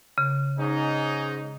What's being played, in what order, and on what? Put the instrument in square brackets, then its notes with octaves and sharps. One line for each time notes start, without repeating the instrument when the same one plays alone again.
[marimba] C#3
[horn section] G#2 C#4 D#4